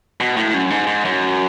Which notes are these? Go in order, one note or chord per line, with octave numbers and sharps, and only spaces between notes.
B2
A2
F#2
G#2
G#2
F#2